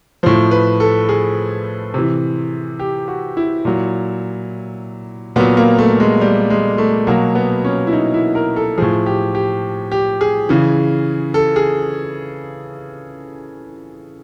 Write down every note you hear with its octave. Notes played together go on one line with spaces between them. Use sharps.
A2 F3 C5
B4
A4
G#4
C3 E3
G4
F#4
E4
A#2 F#3
A#2 F#3 B3
A#3
A3
G#3
G3
G#3
A3
B2 F#3 A#3
B3
C#4
E4
D#4
E4
A#4
A4
A2 F3 G#4
G4
G4
G4
G#4
C#3 E3
A4
G#4